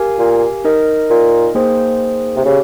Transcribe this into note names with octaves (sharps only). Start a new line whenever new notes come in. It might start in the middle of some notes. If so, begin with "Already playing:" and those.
Already playing: G4 A#4 F5 G#5
A#2
D#4 A#4 D#5
A#2
A#3 D#4 G#4 C5 G5
C3
C#3 G4 C#5